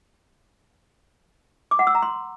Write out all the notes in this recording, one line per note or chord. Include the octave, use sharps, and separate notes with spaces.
D6
F#5
E6
A#5
C6